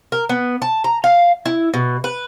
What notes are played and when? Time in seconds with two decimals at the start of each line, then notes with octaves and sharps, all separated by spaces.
0.12 A#4
0.29 B3
0.62 A5
0.84 A#5
1.04 F5
1.46 E4
1.74 B2
2.04 B4